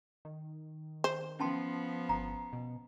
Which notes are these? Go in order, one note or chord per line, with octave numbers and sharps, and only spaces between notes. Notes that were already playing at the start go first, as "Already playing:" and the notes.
D#3
C5
F3 B3 C#4 A5 C6
G1 A#5
B2